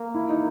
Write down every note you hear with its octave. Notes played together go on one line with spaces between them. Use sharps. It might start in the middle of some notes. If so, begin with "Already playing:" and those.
Already playing: A#3
E4
D#4